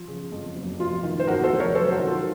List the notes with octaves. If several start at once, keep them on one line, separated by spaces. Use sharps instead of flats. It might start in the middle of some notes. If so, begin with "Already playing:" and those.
Already playing: F3
C#3
F2
F#1
F1 F4
D#3
C5
D#2 F#4 A#4
A4 C5
F1
A#4 C#5
F#3 A4 C5
C5
F#4 A#4
D#3
F4 A4